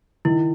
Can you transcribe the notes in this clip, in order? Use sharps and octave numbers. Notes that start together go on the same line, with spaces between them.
D#3 E4